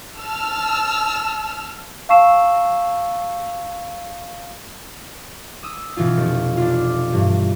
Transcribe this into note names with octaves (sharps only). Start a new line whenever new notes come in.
A5 E6 F6
F5 A5 C#6 E6 C7 E7
D#6 E6
B2 E3 C#4 F4
F1
D4 F4
G2 E3